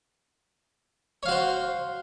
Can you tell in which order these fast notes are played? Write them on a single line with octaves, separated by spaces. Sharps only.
C#5 F5 F#4 C5